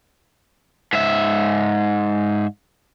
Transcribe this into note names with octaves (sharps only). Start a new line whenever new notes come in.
G#2 E5